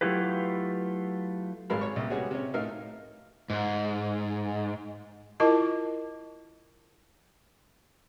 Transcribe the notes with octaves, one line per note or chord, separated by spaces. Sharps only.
F#3 A3 E4 F4 G4 B4
G#1 G#2 G3 A#4 F5 B5
C#5 C#6
C2 A#3
G3 G#3 B3 C#4 F#4 G#4
C3 C#4
A2 A3 D#4 A#4 E5 F5
G#2
E4 F4 A#4 D#5 A5 D6